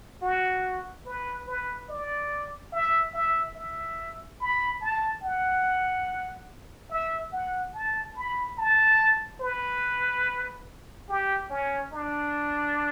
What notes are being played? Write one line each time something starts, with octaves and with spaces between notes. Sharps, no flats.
F#4
B4
B4
D5
E5
E5
E5
B5
A5
F#5
E5
F#5
A5
B5
A5
B4
G4
C#4
D4